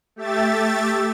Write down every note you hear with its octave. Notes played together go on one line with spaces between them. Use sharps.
A3 G4 E5 A6